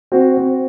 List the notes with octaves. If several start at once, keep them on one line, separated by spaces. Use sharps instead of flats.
C4 F#4
C4